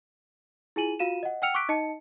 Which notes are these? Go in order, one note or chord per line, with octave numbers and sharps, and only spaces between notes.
E4 F4 G#4 G#5 D#7 F#7
F4 F#4 F5 D#7 E7
D#5 F#5
F#5 G5 E6 F6 C#7 F7
C#6 D6 E6 F#6 B6 D7
D#4 D#5 A5 C#7